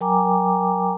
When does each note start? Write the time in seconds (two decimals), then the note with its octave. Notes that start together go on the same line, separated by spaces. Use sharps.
0.01 F#3 A#4 G5 G#5 A#5 D6